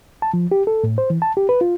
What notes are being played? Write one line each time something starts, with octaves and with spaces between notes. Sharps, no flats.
A5
F3
G4
A4
A2
C5
E3
A5
G4
B4
F4